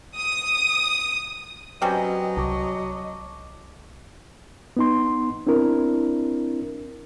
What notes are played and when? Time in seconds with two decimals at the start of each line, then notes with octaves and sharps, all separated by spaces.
0.16 D#6
1.82 F#3 G3 C4 C#4 B4 D#5 G#5
2.37 C2 A5 C#6 D6
4.77 B3 D#4 C6
5.47 C4 D4 E4 A#4